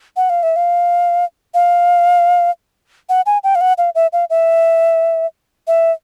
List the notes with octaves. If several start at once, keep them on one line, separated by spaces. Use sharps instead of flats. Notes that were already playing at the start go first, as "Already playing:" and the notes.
F#5
F5
E5
F5
F5
F#5
G#5
G5
F5
F#5
F5
E5
F5
E5
E5